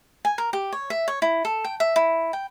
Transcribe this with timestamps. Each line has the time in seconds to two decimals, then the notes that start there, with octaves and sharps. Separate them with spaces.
0.25 G#5
0.38 A#4
0.53 G4
0.73 C#5
0.90 E5
1.08 C#5
1.22 E4
1.45 A4
1.64 G5
1.80 E5
1.96 E4
2.33 G5